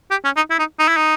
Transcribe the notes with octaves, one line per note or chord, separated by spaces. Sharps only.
G4
C#4
D#4
E4
D#4
D#4
E4
D#4